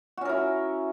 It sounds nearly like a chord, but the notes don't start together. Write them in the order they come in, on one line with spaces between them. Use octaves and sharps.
F#4 C#4 A#4 E4